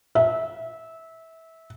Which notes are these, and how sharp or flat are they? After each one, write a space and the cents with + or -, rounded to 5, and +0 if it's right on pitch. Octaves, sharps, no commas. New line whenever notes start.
E5 -20